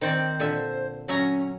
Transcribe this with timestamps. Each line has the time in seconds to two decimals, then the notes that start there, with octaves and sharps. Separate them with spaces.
0.01 D#3 C4 C5 D5
0.40 A#2 D3 E5
1.08 F#3 C#4 E5 A#5